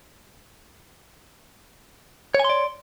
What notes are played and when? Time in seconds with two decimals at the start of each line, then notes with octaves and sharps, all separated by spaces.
2.35 C#5
2.40 G#5
2.45 C6
2.50 D5